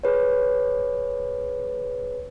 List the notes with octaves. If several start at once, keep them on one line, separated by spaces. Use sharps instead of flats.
G#4 B4 C#5